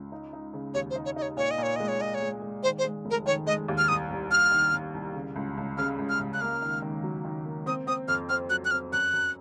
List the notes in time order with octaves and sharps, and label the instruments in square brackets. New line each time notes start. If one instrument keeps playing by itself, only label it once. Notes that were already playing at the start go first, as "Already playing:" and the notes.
Already playing: [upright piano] C#2
D#4
D#4
C#3
[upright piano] D#2 [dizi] C#5
[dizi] C5
[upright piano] D#4
[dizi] C#5
[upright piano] D#4 [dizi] D#5
[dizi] C#5
[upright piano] A#2 [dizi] C#5
[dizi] D#5
[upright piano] A#2 [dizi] C#5
[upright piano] G#3 [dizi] D#5
[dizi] C#5
[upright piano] A#2 [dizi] D#5
[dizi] C#5
[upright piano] G#3
G#3
[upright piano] D#3 [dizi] C5
[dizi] C5
[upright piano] G#3
F1
[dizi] A#4
[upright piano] D#3 [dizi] C#5
[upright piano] G#3 [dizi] D#5
[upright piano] D#2
[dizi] F6
[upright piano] C2 [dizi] D#6
[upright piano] C2
[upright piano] C2 [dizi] F6
[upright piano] D#3
C2
C2
C#3
C#2
C#2
[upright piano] C#3 [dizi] F6
[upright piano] C#2
[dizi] F6
[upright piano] C#2
[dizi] F#6
[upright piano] A#3 [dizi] F6
[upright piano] D#3
D#3
F#3
D#3
A#3
[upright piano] C4 [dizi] D#6
[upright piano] C4 [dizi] D#6
[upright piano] F2 [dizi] F6
[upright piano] C4 [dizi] F6
[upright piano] F#3 [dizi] F#6
[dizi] F#6
[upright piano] C4 [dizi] F6
[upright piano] F#2 [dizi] F#6
[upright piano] F#2